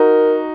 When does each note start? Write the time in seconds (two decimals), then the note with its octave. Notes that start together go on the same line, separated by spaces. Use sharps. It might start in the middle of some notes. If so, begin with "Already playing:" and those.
Already playing: D#4 F#4 A#4